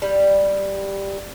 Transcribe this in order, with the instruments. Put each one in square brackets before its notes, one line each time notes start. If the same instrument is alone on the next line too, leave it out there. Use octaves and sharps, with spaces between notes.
[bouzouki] G3